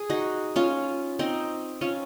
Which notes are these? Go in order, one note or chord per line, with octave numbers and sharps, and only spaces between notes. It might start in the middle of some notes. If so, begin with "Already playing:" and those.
Already playing: G#4
D#4 F#4
C#4 F4
C4 D#4
C#4 F4